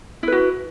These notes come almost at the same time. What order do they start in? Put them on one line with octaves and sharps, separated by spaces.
E4 B4 F#4